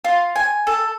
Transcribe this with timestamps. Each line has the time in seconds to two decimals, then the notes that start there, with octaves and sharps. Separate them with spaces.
0.05 F4
0.36 G#5
0.67 A4